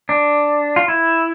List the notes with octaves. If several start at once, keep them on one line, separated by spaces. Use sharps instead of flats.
D4
F4
E4